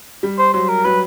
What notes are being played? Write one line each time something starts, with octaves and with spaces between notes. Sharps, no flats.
G3
C5
F#3 C5
A#4
F#3 B4